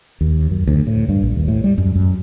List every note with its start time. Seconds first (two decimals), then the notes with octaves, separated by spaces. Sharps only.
0.21 D#2
0.51 F#2
0.67 D2
0.87 A2
1.09 G2
1.22 A#1
1.36 D#2
1.48 A2
1.64 G3
1.78 F#2
1.95 F#2